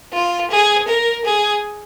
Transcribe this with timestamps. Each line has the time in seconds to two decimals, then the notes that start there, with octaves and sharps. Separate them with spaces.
0.14 F4
0.51 G#4
0.88 A#4
1.25 G#4